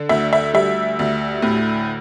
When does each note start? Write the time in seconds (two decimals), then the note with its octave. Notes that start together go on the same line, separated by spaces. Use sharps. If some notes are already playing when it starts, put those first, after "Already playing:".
Already playing: D3
0.09 D2 E5
0.33 E5
0.54 G3 E5
0.99 D2
1.42 A2